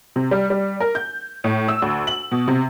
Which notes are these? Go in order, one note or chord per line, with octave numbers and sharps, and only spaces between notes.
C3
G3
G3
A#4
G6
A2
E6
D2
F#7
B2
C3